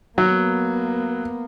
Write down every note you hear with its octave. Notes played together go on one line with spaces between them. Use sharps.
F#3 A#3 B3